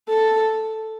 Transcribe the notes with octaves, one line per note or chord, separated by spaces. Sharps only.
A4